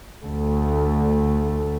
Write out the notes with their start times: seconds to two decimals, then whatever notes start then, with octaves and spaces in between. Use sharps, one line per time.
0.25 D2 A3